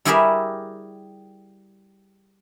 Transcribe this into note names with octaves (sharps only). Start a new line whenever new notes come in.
G3 E4 G4 G#4 A#4 E5